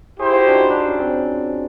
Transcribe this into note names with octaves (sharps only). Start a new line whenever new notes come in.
E4 G4 G#4 C5
F4
F#4
D4
D#4
D4
C#4
C4